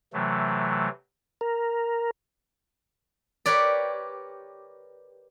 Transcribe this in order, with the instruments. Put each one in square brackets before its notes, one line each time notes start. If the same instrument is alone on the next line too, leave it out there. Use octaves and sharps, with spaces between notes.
[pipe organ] C3 E3 F#3 A3
[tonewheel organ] A#4
[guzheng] G4 A#4 B4 C#5 D5